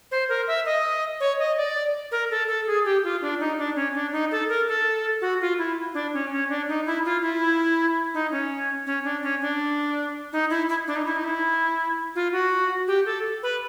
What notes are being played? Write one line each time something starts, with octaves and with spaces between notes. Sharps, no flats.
C5
A#4
E5
D#5
C#5
D#5
D5
A#4
A4
A4
G#4
G4
F4
D4
D#4
D4
C#4
D4
D#4
A4
A#4
A4
F#4
F4
E4
D4
C#4
C#4
D4
D#4
E4
F4
E4
D#4
C#4
C#4
D4
C#4
D4
D#4
E4
E4
D4
D#4
E4
D#4
E4
F4
F#4
G4
A4
B4